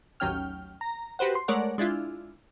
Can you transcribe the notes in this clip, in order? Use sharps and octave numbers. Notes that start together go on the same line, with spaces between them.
A1 D#2 F#3 C#4 G5 F6
A#5
F#4 G4 B4 C5 F#5
C6
G#3 A3 A#4 C#5 D5 F#5
G#3 D4 E4 F4